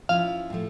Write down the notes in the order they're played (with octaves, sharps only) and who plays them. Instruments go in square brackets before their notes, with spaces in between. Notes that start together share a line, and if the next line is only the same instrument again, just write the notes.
[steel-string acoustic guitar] F3 C#4 E4 [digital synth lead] F5
[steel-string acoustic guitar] A2 F3 A3